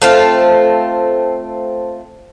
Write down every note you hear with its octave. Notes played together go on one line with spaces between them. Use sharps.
A3 C4 F4